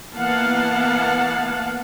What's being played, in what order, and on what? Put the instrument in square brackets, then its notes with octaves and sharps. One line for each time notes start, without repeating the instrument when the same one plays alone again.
[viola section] E3 A#3 B3 F5 F#5 A5